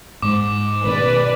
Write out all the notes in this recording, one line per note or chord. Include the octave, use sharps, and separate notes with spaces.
G#2 G#3 D6
B2 D#3 B4 D5